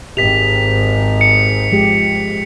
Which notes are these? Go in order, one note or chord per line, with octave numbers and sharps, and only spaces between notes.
G#1 G#2 G4 B6 F7
C#7
F3 G#3 G4